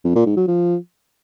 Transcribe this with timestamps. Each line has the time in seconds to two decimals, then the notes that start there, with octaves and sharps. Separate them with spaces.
0.05 F2
0.16 A#2
0.26 G#2
0.37 F#3
0.48 F3